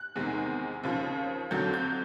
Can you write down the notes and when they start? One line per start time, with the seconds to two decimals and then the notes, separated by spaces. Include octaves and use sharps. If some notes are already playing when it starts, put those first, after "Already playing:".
Already playing: F#6
0.16 E2 C3 D#3 G#3
0.83 D#2 C#3 F3
1.51 F2 D3 F#3 G6
1.74 G6